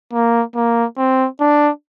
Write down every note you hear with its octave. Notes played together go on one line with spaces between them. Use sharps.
A#3
A#3
C4
D4